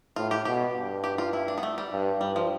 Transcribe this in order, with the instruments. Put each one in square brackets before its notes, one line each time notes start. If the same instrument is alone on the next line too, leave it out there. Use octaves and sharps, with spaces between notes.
[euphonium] A2 [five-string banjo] F4
[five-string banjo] G4
[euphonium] B2 [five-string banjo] G4
[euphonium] G2
[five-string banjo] G4
F4
E4
D4
B3
A3
G3
[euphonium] G2
[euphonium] G2 [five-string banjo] G3
[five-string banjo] F3